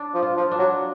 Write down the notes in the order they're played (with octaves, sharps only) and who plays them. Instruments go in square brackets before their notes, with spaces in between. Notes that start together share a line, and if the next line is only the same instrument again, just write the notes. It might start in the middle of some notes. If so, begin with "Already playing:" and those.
Already playing: [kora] D4
[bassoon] F3
[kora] F4
[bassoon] F3
[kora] D4
[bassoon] F#3